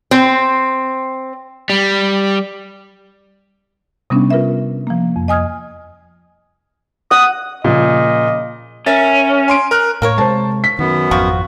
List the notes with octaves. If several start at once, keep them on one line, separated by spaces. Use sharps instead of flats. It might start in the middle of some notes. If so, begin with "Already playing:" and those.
C4
G3
C3 G3 B3 C#4 D4
F4 A#4 B4 E5
F3 A#3
F2
D#5 G#5 D#6 F6 G#6
F#5 D#6
A#2 C#3 F3 D#5
C#4 A#4 E5 A6
G#5 C6 D7
A#4 F6 F#6
A2 A#3 A#4 C#5
C3 G#3 C5 A5
B6
F#2 D#3 B3
G#1 F2 F3 F4 F#4